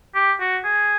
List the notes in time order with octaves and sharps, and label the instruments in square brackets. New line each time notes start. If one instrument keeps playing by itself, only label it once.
[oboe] G4
F#4
G#4